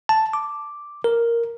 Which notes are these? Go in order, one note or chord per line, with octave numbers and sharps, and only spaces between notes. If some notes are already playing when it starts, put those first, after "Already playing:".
A5
D6
A#4